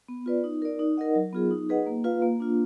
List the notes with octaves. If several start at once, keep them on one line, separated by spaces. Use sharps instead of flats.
B3
F4 B4 D5
D#4
A#4 D5
D#4
A#4 D#5 F#5
F#3
B3 F4 G#4
D#4
G#4 B4 D#5 F#5
A#3
F4 B4 F5
A#3
D4 F4